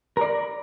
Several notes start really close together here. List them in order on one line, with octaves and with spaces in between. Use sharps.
A#4 D5 B5